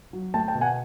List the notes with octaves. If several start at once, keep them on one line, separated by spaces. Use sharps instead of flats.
F#3
A3 G5 A5
G5 A5
B2
F#5 G#5